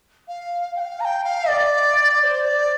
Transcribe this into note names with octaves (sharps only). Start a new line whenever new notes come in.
F5
G5
F5
A#5
G5
F5
D5
D5
C5
D5